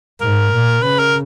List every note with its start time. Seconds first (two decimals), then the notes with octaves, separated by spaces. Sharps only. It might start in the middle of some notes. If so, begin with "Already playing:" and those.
0.21 G#2 A#4
0.52 A#2
0.83 C#3 B4
0.99 A#4